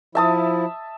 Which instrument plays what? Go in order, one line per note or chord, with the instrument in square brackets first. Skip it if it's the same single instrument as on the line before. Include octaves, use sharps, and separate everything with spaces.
[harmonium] F3 E4 [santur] E5 A5 D#6